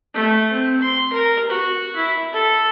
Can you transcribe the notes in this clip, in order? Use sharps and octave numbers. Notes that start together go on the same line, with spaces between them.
A3
C4
C6
A#4
F#4
E4
A4